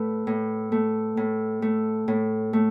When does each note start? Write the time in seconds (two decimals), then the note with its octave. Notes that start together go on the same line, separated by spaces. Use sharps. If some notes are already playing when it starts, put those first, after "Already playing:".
Already playing: A2 A3 B4
0.27 A2
0.72 A3
1.17 A2
1.62 A3
2.08 A2
2.53 A3